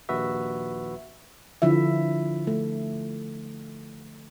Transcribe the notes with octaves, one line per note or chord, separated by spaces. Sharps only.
A#1 D#2 F#4 B4 E5
D3 F3 E4 E5
A3